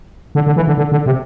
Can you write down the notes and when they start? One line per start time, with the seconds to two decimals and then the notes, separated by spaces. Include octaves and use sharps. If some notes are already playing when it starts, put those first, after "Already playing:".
0.35 D3
0.47 D3
0.56 E3
0.67 D3
0.78 D3
0.92 D3
1.06 C3